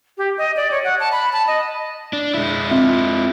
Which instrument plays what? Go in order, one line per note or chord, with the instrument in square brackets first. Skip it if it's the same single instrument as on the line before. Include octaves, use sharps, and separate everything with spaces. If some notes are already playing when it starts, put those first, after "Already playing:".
[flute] G4
D#5
D5
C#5
F#5
A5
B5
A5
D#5
[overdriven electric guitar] D4
G#3 E4
[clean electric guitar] C4 F4 E5